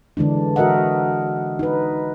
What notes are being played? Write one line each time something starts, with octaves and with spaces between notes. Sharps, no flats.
D3 E3 G#3 D4
F#4 A#4 D#5 E5 F#5
D#4 B4